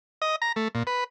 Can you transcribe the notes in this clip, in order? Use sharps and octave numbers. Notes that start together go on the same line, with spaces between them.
D#5
A#5
A3
A#2
B4